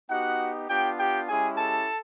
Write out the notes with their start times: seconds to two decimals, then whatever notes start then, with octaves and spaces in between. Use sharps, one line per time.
0.10 B3 D#4 F#4 G4 F#5
0.69 B3 D4 F4 G4 G5
0.99 G4 G5
1.29 G#3 C#4 E4 G4 G#4 G#5
1.58 A4 A5